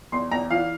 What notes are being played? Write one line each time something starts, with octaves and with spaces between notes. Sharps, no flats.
E2 C6
E2 A#5
E3 F5